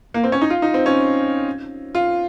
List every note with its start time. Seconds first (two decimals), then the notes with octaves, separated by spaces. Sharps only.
0.14 A#3
0.24 C4
0.32 C#4
0.41 D#4
0.50 F4
0.62 D#4
0.74 C4
0.86 C#4
1.95 F4